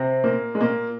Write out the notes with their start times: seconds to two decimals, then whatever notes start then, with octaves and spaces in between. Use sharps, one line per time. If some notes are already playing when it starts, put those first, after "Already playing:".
Already playing: C3 C4
0.24 A#2 A#3
0.55 G#3
0.61 A#2 A#3